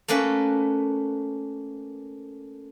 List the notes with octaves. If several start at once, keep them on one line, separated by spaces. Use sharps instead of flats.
A3 A#3 C#4 B4